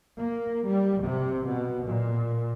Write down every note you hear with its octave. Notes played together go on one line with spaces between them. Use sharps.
A#3
G3
C3
B2
A#2